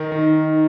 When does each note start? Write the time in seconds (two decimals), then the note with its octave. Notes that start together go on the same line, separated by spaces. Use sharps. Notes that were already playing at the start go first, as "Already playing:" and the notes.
Already playing: D#3 D#4 A#4
0.12 D#3